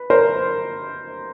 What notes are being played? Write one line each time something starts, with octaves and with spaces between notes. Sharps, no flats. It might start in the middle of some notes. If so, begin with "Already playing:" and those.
Already playing: B4
A#4 C5